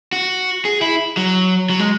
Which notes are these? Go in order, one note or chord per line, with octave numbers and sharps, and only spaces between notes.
F#4
G#4
E4
F#3
F#3
G#3